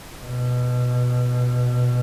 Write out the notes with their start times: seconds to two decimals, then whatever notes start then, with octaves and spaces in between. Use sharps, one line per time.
0.19 B2